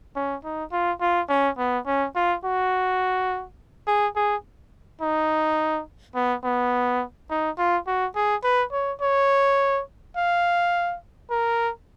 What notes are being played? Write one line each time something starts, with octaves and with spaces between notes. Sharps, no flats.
C#4
D#4
F4
F4
C#4
B3
C#4
F4
F#4
G#4
G#4
D#4
B3
B3
D#4
F4
F#4
G#4
B4
C#5
C#5
F5
A#4